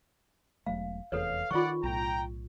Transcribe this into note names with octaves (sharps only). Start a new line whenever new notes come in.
E1 F#3 A3 F5
F1 E2 A4 B4 C#5 F5
D#3 E3 F4 D5 F#5 C#6
B1 A2 G5 A#5